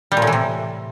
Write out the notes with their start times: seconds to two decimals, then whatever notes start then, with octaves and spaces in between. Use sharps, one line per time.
0.12 G3
0.17 A#2
0.22 A2
0.27 E3
0.32 C3